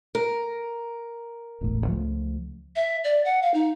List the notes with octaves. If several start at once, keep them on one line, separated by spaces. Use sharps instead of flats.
A#4
E1 A1 A2
C#2 F3 A3
E5
D5
F#5
F5
D#4